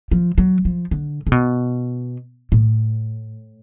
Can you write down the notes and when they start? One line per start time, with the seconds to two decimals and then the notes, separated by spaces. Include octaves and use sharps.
0.11 F3
0.38 F#3
0.65 F3
0.91 D3
1.27 C#3
1.32 B2
2.52 A2